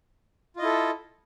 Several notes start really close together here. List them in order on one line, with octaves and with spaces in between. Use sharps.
F4 D#5 E4 A4